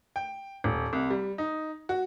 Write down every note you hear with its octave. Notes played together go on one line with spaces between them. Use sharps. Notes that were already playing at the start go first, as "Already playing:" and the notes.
G5
D#1
C2
G3
D#4
F#4